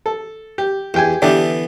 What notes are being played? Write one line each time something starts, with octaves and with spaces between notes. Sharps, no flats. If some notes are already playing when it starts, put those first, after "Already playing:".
A4
G4
E2 G4 G5 G#5
D3 E3 B3 D4 G4 E5